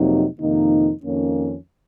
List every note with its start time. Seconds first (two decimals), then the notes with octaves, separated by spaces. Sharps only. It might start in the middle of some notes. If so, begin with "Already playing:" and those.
Already playing: F2 C3 F#3 A#3 D#4
0.38 F2 C3 D#3 A#3 D#4
1.03 F2 D#3 A#3 C#4